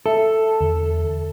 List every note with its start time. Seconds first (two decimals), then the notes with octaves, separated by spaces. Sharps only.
0.06 A4 E5
0.61 E2 D3